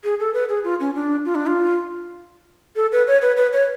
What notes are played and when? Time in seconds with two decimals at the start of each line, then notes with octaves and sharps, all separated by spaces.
0.04 G#4
0.20 A4
0.34 B4
0.49 G#4
0.64 F4
0.80 C#4
0.95 D4
1.25 F4
1.35 D4
1.47 F4
2.76 A4
2.92 B4
3.07 C#5
3.22 B4
3.37 B4
3.53 C#5